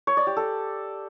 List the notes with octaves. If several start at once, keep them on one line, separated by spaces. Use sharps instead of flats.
C#5
D5
G4
A4